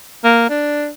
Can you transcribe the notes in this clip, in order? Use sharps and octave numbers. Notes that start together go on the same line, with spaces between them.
A#3
D4